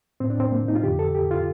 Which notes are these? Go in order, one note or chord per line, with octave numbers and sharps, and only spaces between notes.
A2 C4
D4
C4
A#3
D#4
F4
F2 D3 G4
A4
G4
F4